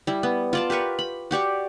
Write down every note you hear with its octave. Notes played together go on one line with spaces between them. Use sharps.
G3 E4
B3
F4 D5 A5
G4 A#4 B4 C#6
B5
F#4 G4 D5 C#6